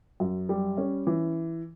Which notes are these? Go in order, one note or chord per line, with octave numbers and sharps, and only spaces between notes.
F#2
G3
C#4
E3